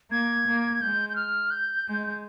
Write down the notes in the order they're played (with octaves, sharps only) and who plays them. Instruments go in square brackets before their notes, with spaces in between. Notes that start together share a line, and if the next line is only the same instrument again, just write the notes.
[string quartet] A#3 [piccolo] G#6
[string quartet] A#3
[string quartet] G#3 [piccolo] G6
[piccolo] G6
F6
G6
[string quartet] G#3